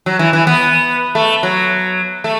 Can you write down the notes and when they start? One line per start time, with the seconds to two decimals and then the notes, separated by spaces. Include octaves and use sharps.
0.06 F#3
0.19 E3
0.33 E3
0.47 B3
1.15 A3
1.43 F#3
2.24 A3